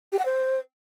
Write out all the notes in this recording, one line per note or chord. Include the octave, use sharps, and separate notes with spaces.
G4
F#5
C5